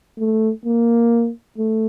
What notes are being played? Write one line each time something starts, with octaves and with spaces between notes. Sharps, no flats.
A3
A#3
A3